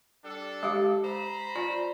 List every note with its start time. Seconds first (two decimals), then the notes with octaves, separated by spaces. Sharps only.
0.25 G3 D4 A4
0.63 G#3 G4 F5
1.05 C5 A#5 B5
1.56 F4 D5